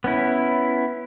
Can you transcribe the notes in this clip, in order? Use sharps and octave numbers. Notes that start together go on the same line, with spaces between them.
B3 C#4 E4